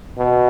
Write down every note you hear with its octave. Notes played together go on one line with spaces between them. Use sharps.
B2